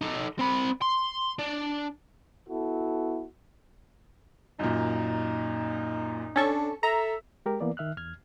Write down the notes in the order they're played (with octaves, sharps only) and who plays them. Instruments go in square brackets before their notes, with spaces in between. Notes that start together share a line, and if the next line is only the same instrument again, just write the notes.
[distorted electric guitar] D#4 A4
C4 B5
C6
D4
[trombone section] B3 E4 F#4 A4
[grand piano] F#2 A#2 [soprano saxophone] D#4
[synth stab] C#4 A4 C#6 [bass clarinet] D4
[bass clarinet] A4 [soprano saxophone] E5 [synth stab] A#5
[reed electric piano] G#3 G4 A#4
E3 A#3 B3 D5
D#3 E5 F6 F#6
E2 F6 G#6